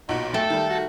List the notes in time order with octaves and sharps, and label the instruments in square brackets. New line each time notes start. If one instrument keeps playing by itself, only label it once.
[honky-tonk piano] B1 A#2 F#4 [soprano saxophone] D#4
[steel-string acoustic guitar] A3 [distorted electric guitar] A4 [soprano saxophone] G5
[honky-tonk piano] D#3 G3
[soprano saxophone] F#4